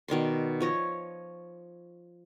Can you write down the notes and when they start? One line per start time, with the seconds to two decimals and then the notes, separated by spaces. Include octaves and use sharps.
0.08 B2 D#3 D5 C6
0.60 F3 C#5 D#5